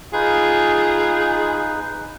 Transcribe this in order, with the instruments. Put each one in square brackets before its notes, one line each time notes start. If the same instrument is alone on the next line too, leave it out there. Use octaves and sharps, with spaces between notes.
[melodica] D#4 B4 [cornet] F4 [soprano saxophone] G#4